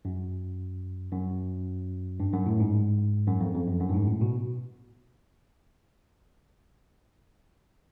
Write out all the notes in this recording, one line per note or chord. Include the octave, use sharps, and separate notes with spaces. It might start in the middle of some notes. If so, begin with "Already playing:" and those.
F#2
F#2
G2
F#2
A2
G#2
F#2
F2
F2
F#2
F#2
G2
G#2
A2
B2